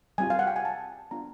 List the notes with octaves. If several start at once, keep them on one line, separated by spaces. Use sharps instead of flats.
G3 C4 F4 G#5
F5
F#5
G5
G#5
A5
B3 D4 F4 A#5